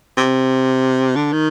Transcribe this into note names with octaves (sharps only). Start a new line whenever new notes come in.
C3
D3
D#3